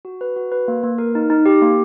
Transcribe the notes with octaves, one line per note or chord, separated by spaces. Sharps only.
F#4
B4
F#4
B4
A#3
A#3
A#4
D#4
D#4
G4
A#3